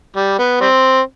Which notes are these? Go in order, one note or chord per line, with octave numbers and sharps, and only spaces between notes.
G3
B3
G3 C4